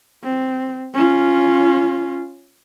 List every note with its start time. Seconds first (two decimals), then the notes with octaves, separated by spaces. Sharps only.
0.24 C4
0.94 C#4 F4